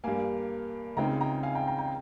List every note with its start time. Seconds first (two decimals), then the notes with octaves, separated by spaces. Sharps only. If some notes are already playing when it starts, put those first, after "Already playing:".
0.04 G2 G3 A#3 F5 G#5
0.97 C#2 C#3 G#3 C4 D#4 G5 A#5
1.21 G5 A#5
1.43 F5 G#5
1.55 G5 A#5
1.67 G5 A#5
1.79 G5 A#5